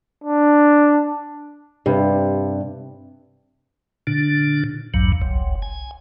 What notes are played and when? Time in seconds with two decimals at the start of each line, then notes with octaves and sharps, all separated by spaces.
0.24 D4
1.86 G2 C3
4.07 A#2 D3 D4
4.94 A#1 E2 G2 F#3
5.22 F#1 C2
5.62 G#5